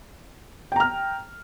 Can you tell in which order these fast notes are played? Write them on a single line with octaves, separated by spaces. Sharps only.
G5 A#5 F6